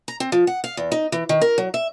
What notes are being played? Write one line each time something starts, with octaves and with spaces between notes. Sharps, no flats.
A#5
C4
F3
F#5
F5
E2
D#4
E3
D#3
A#4
F#3
E5